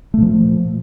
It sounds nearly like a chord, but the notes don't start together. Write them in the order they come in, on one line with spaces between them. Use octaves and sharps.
A3 A#2 F3